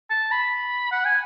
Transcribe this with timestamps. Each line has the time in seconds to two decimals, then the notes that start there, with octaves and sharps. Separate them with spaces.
0.10 A5
0.32 B5
0.92 F#5
1.05 G#5